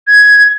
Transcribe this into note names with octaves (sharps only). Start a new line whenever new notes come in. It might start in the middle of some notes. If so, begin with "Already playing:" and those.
G#6